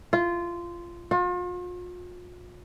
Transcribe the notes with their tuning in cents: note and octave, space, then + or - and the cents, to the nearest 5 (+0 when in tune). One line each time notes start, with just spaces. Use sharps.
F4 -15
F4 +40